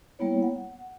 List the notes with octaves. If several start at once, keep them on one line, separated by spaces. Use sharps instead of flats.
G3 A#3 B3 E4 C#5
F#5